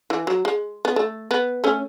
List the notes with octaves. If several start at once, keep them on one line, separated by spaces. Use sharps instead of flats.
E3
F#3
G#3
B3
A3
B3
A3 C#4